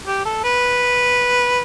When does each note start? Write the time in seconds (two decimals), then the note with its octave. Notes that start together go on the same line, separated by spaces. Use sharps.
0.07 G4
0.25 A4
0.44 B4